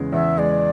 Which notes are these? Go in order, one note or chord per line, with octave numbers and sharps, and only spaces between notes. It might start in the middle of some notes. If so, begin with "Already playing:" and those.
Already playing: E2 C#3 G#3 B3
E2 E5
G#3 D5